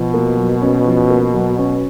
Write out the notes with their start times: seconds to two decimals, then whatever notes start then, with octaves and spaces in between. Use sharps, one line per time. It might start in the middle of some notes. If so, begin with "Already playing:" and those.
Already playing: B2 F3
0.14 A#3
0.37 F#3
0.61 C#4
0.85 F3
1.10 A#3
1.33 F#3
1.58 C#4